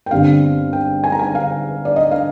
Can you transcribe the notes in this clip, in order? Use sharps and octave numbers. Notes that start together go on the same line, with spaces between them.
G5
G1 G2 D3 G3 C4 F5
G5
G#5
A#5
G#5
F5
D5
D#5
F5